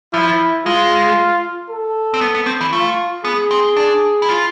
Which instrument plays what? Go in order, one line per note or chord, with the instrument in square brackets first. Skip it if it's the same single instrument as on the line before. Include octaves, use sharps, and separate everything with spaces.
[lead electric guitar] F3 [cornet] E4
[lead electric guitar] G#3 [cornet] F4
[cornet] A4
[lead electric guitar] C4
B3
B3
C4
E3
[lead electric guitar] A3 [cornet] F4
[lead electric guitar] B3 [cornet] G#4
[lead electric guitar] C4
D4
E4
F4